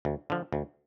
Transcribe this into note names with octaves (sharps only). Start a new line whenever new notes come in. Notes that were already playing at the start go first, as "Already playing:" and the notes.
D2
D3 F3
D2